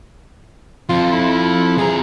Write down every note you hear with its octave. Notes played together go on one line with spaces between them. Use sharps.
F2 F4
E4
F2 G#4 A#5